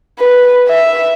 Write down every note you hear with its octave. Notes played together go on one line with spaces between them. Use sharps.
B4
E5